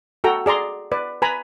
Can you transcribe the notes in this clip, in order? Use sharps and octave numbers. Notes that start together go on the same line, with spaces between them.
F#4 A4 G5 A#5
G#4 D5 A#5 C6
B4 D5
B4 G#5 A#5 B5